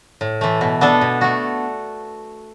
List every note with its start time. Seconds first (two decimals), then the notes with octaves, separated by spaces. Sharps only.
0.21 A2
0.41 E3 A3
0.61 B2
0.81 B3 D4 A4
1.01 B2
1.21 A3 F#4